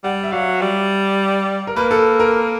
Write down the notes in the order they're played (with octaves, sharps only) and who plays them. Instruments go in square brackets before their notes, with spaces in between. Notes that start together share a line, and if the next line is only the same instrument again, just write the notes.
[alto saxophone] G3 [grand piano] F#5
[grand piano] E5
[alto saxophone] F#3 [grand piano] F5
[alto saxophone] G3
[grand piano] A#4
[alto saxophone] A#3 [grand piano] B4
[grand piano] A4
A#4